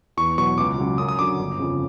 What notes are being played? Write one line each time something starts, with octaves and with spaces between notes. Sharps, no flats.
E2 C#6
B2 F#3 C#6
C#2 D6
C#3 F#3
F#2 D#6
D#6
D3 F#3 D6
G1
F2 C#3